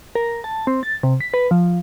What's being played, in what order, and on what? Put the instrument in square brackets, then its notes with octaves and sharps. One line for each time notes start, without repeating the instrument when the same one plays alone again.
[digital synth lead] A#4
A5
C4
A6
C3
B6
B4
F3